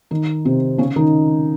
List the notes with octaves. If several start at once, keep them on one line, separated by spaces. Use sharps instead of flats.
D#3 D#4
C3 C4
C#3 C#4
D#3 D#4